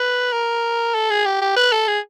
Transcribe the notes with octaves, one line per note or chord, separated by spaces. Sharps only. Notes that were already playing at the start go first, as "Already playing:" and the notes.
Already playing: B4
A#4
A4
G#4
G4
G4
B4
A4
G#4